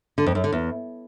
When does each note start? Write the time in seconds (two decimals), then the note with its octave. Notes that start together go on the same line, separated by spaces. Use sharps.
0.18 D3
0.26 F2
0.35 F#2
0.44 D3
0.52 E2